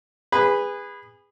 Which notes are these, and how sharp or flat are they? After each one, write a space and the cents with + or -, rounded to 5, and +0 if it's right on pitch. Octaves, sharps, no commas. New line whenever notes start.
G#4 -25 B4 +0